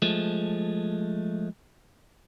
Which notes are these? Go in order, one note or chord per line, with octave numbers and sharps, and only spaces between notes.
F3 G#3 A3